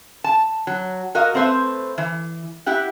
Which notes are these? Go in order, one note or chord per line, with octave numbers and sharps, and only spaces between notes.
A5
F#3
F#4 A#4 D#5 F5
A3 C4 B4 C5 E5
E3
E4 G4 F#5